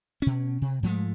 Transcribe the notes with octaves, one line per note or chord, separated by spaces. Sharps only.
B2 C#4
C3
G#2 F3 G#3 A3